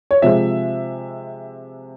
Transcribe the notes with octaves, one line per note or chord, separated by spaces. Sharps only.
C#5
C3 F3 G#3 E5